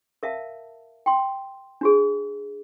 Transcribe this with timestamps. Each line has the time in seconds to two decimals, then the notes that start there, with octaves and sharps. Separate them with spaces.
0.23 A#4 E5 F5 A5
1.06 G5 C6
1.81 D4 F#4 G#4